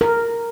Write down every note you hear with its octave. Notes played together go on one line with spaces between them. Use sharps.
A#4